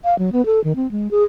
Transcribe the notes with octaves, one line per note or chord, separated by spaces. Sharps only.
F5
F#3
B3
A4
D#3
C4
G#3
G#4